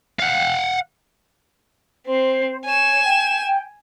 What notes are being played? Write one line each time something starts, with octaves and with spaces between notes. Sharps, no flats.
F5 F#5
C4 C5
C#5 G#5 E7
G5